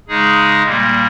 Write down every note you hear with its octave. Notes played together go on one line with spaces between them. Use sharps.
C#3 G#3 D#4 G#4
A#2 G3 A#3